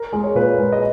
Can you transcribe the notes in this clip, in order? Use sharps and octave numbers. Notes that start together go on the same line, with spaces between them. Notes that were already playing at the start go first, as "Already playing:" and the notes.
Already playing: A#4
G#3
C#5
A#2 B4
G#3
D#5